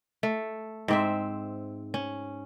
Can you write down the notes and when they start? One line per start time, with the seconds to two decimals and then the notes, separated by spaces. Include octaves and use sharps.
0.23 A3
0.88 G#2 C4 E5
1.94 C#4